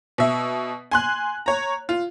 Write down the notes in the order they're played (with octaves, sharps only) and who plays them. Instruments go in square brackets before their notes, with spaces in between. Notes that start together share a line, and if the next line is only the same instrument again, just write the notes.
[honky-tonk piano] B2 E5
G#5 C6 F#6
C#5 A#5
F4